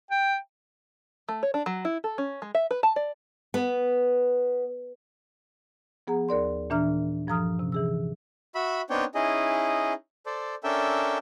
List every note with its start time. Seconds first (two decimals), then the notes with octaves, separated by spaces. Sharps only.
0.11 G5
1.29 A3
1.43 C#5
1.54 D4
1.66 F#3
1.85 E4
2.04 A4
2.18 C#4
2.42 G#3
2.55 E5
2.71 B4
2.83 A5
2.96 D5
3.54 B3
6.07 F3 B3 G#4 F#5 A#5
6.29 D#2 A#4 D5 C6
6.70 A#2 E3 D4 E5 A#5 F6
7.27 G2 F3 A4 A#5 D#6 F6
7.59 C3 C#4
7.72 E3 G#4 E6
8.55 F#4 E5 B5
8.90 B3 C4 D4 D#4 C#5 G5
9.15 C#4 D#4 E4 G#4 D#5
10.26 A4 C5 D5
10.64 C#4 D4 A4 A#4 E5 G5